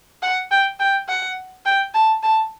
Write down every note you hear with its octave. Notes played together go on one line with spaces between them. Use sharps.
F#5
G5
G5
F#5
G5
A5
A5